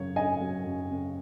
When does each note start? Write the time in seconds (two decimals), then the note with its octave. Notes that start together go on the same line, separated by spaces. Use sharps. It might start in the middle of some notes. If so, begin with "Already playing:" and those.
Already playing: F#2 C#3 F#3 C#5
0.16 C#4 D#5 G#5
0.41 F#3
0.66 F#2
0.90 C#3